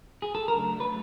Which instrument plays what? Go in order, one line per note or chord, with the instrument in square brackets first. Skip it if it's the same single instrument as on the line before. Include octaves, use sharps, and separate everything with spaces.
[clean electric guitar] G#4
A4
[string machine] C#3 F#3 A3 D4 [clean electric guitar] A#4
[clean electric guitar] B4